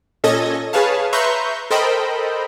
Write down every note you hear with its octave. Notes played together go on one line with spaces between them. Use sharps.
A#2 C#4 A4 D#5 G#6 A#6
G#4 B4 C#5 F5 A5
B4 E5 A#5 C6 C#6 G6
A4 A#4 C5 D#5 G5 B5